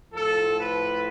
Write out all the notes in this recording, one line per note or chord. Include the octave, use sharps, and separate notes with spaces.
A2 F3 A4
B4